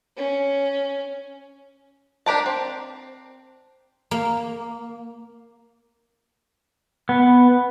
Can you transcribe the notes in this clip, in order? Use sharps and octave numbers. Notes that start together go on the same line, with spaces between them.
C#4
D4 G4 A#4 A5
C4
A#3
B3